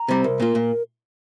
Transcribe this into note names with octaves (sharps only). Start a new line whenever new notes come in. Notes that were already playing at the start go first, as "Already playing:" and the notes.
Already playing: A#5
C3 G3 C4
C2 A#4
A#2 A#3 F4
A#2